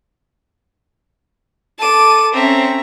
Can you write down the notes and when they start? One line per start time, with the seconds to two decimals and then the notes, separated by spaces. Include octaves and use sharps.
1.79 A4 A5 D6 D#7
2.33 C4 C#4 E5 A#5